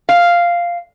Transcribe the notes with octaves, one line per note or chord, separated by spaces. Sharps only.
F5